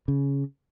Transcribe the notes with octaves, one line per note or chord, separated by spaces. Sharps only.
C#3